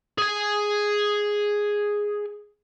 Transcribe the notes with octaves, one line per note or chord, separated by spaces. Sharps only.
G#4 G#5